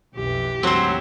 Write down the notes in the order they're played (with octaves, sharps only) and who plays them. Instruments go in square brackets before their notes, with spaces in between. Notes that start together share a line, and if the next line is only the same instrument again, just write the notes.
[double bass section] B1 F2 E3 [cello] G4
[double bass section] D2 G#2 E3 [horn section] F#3 [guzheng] C4 C5